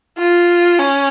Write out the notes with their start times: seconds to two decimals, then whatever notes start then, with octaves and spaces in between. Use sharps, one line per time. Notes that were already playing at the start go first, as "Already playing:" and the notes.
0.18 F4
0.79 C#4